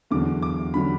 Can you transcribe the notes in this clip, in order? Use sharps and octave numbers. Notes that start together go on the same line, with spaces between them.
E2 D3 F#3 D6
D6
D3 F#3 B5